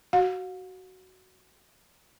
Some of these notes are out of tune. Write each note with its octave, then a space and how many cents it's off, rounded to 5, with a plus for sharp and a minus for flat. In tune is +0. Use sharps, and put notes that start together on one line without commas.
F#4 +10 F5 +45